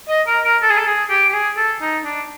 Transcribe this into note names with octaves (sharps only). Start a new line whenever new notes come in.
D#5
A#4
A#4
A4
G#4
A4
G#4
G4
G4
G#4
A4
D#4
D4